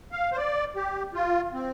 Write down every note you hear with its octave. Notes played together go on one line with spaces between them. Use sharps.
F5
C5
D5
G4
F4
C4